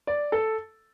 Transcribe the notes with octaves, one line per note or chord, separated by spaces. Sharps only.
D5
A4